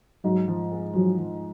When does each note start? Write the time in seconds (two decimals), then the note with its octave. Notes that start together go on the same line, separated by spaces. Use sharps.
0.24 G#2 F#3
0.48 F3
0.72 G#3
0.95 F3 F#3
1.19 F3